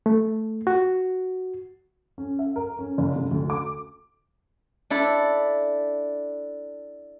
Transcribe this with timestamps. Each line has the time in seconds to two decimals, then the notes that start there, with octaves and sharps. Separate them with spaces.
0.06 A3
0.67 F#4
2.18 C#4
2.39 E5
2.56 A#4
2.79 C#4
2.98 F#1
3.16 C3
3.31 D2
3.50 D6
4.90 D4 E4 A4